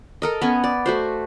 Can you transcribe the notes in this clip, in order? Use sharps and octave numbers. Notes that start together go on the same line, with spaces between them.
A4 A#4 D#5
B3 C#4 G#5
D5
A3 F#4 C5